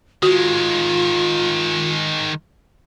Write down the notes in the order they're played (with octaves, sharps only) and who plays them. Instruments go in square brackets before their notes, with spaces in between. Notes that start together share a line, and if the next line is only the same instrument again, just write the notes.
[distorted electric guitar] D#3 G#3 [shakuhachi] F4 [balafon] F#4